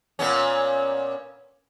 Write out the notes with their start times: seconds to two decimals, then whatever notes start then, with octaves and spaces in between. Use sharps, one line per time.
0.19 A#2 B3 C#4